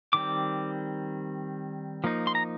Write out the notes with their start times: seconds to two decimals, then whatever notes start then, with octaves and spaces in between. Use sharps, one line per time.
0.13 D#3 G3 C4 D6
2.04 F3 A#3 D#4
2.27 C6
2.35 A#5